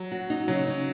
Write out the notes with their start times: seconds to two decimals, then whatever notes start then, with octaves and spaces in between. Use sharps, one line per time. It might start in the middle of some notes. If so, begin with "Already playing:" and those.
Already playing: F#3
0.12 F#4
0.30 D#4
0.48 C#3 F#3
0.67 D#4